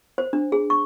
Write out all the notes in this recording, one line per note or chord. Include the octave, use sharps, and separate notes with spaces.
C5
D4
G#4
C#6